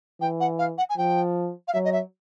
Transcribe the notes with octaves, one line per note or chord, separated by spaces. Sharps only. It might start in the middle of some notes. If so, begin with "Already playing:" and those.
E3 G5
F#5
F5
F#5
G#5
F3 G5
F5
F#3 E5
D#5
E5